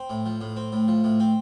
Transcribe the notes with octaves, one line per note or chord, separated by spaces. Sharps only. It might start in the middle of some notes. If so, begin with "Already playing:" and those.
Already playing: C4
A2
F3
A2
C4
A2
F3
A2
C4